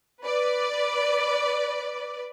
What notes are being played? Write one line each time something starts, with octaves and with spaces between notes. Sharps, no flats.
B4 D5